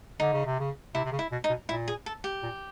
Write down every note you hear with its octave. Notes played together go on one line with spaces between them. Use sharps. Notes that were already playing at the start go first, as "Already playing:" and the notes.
D3 D#4
C#3
C3
C#3
C3 E4
C3
C#3
E4
B2
D#4
B2
A#2 E4
G#4
A4
G4
A#2